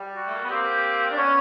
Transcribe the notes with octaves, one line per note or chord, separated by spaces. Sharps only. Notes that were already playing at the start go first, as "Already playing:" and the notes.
Already playing: G3
F#4
A3
A#3
B3
A#3 C4 G4
D4
B3 C#4 C#5